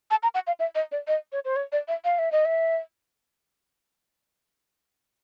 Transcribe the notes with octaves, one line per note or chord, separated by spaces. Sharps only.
A5
A#5
F#5
F5
E5
D#5
D5
D#5
C#5
C5
C#5
D5
E5
F5
E5
D#5
E5